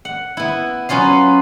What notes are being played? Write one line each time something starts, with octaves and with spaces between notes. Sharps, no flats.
F#5
B3 E4
F#3 B3 C#4 F4 F5